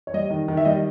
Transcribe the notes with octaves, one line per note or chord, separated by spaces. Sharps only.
C#5
G3 D#5
D#3
D#3
E5
G3 D#5